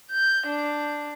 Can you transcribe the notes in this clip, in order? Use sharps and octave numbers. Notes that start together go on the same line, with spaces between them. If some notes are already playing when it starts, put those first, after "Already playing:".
G6
D4